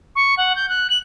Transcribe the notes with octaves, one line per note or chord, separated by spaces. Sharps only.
C#6
F#5
G6
F#6
F#7